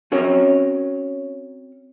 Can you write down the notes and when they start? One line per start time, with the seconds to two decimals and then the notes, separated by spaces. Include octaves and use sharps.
0.12 C4 C#4 F#4 A#4 C#5